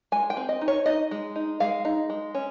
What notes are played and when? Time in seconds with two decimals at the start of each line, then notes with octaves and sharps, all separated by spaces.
0.12 G#3 G#5
0.30 G5
0.37 C4
0.49 D#5
0.61 D#4
0.68 C#5
0.86 D#4 D#5
1.11 G#3
1.36 D#4
1.60 G#3 F5
1.85 D#4
2.10 G#3
2.35 C#4